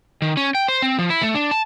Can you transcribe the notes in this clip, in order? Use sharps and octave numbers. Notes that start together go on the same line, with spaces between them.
D#3
C#4
G5
C5
C4
F3
E4
A3
D4
A5